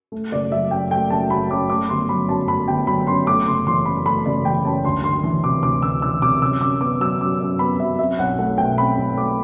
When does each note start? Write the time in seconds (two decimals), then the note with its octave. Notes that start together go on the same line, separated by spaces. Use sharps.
0.12 A3
0.32 F#1 D5
0.52 F#3 E5
0.71 F#2 G5
0.91 A3 G5
1.10 F#1 A5
1.30 F#3 B5
1.50 F#2 D6
1.70 A3 D6
1.89 G1 C6
2.09 F#3 B5
2.29 F#2 A5
2.48 A3 B5
2.68 G1 G5
2.87 F#3 B5
3.07 F#2 C6
3.27 A3 D6
3.47 F#1 C6
3.67 E3 C6
3.86 F#2 B5
4.06 A3 B5
4.26 F#1 D5
4.45 E3 G5
4.65 F#2 A5
4.84 D2 C6
5.04 D2 C6
5.23 E3
5.44 C3 D6
5.63 D2 D6
5.82 D2 E6
6.02 E3 E6
6.22 C3 D6
6.41 F#2 E6
6.61 F#2 D6
6.81 B3 D6
7.01 F#3 E6
7.20 F#2 D6
7.40 F#2
7.59 B3 B5
7.80 F#3 E5
7.99 C4 E5
8.19 B1 F#5
8.38 A3 F#5
8.58 B2 G5
8.78 C4 B5
8.97 B1
9.17 A3 D6